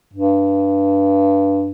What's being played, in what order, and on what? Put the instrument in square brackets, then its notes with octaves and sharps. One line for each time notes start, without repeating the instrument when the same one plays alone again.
[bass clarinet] G2